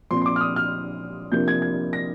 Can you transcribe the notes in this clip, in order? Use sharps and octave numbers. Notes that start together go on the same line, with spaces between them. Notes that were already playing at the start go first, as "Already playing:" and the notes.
A#2 F3 C4 C6
C6
D6
F6
D#6
F6
C3 F3 A#3 D4 G6
G#6
G#6
A#6